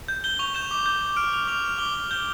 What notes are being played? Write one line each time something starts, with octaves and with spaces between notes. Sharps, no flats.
G6
G6 G7
C#6 F7
G6 E7
D6
G6
D6
F6 D7
D6 F7
D6 F7
F6
D6 G7
D6
G6 G7